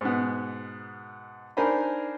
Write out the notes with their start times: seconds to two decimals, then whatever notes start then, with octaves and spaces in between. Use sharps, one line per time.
0.01 G#2 B2 B3
1.57 D4 D#4 A#4 C5 G#5 B5